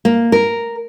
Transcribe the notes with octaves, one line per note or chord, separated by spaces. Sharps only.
A#3
A#4